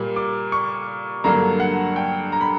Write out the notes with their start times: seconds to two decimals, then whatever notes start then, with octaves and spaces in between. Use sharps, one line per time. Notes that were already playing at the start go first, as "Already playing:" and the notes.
Already playing: A#2 G3 A#3
0.16 D6
0.52 C#6
1.24 G2 D3 F#3 A#3 A#5
1.60 F#5
1.96 G5
2.32 A#5
2.41 B5